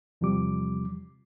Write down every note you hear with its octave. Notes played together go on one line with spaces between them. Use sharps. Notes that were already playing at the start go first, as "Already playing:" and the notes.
E2 C3 F3 G3 D6